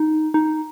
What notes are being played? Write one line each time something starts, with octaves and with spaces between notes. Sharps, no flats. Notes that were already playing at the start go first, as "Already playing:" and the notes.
Already playing: D#4
D#4